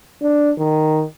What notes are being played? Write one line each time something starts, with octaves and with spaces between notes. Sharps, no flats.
D4
D#3